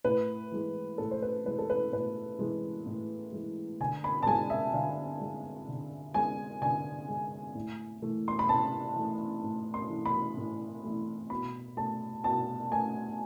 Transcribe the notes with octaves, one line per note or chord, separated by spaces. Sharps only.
A2 B4
E3 G#3
A2 A4
C5
B4
E3 G#3 B4
A4
B4
A2 B4
E3 G#3
A2
E3 G#3
D3 G#5
B5
A5
G#3 G#5
E5
D3 F5
G#3
D3
G#3 G#5
D3 G#5
G#3
A2
E3 A3
C6
B5
A2 A5
E3 A3
A2
C6
E3 A3
B5
A2
E3 A3
B2 B5
A3 A5
B2 A5
A3 G#5